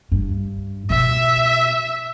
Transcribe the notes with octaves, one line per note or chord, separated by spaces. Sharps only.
G2
B2 E5